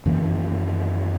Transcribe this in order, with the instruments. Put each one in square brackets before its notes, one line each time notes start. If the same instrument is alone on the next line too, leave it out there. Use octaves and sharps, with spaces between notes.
[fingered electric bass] F#2 D#3 E3 A#3